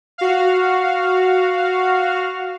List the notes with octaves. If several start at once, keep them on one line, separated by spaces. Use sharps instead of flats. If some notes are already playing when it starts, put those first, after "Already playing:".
F#4 F5